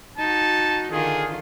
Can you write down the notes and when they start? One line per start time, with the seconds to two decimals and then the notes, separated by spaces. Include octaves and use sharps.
0.18 D#4 F#4 A5
0.92 D3 D#3 F4 G#4